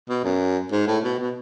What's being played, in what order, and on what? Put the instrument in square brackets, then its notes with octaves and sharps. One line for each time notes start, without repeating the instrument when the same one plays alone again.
[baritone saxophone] B2
F#2
G#2
A2
B2
B2